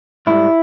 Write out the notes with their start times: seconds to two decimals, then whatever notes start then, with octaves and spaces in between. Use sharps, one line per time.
0.27 G#2 G3 E4